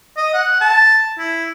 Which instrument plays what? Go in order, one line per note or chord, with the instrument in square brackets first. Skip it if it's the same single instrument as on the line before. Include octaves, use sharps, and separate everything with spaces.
[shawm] D#5
F#5
A5
E4